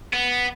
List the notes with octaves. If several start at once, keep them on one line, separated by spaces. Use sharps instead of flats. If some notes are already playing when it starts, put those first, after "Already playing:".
B3